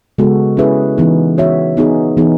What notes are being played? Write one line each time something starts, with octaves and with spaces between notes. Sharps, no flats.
C#3 G#3 B3 F#4 A4
C#4 E4 G#4 B4 E5
E3 B3 D#4 G#4
C#4 F#4 C#5 E5
B3 D#4 G#4
E3 B3 D#4 G#4